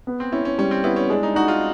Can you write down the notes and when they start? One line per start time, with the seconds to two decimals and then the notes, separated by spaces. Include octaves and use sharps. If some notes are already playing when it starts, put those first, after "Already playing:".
0.07 B3
0.20 C4
0.32 C#4 E4
0.45 C#4
0.58 G3 C#4
0.71 C4
0.84 B3 E4
0.96 C#4
1.10 G#3 D4
1.23 D#4
1.35 D#4 F#4
1.48 F4